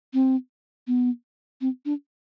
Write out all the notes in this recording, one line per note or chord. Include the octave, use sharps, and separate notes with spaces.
C4
B3
C4
D4